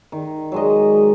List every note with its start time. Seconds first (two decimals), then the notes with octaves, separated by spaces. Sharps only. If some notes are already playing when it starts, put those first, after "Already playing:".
0.12 D#3
0.52 F#3 G#3 D#5